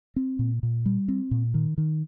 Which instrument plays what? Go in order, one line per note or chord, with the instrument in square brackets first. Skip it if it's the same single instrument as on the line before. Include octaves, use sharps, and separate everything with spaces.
[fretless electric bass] C4
A#2
A#2
G3
C4
A#2
D#3
D#3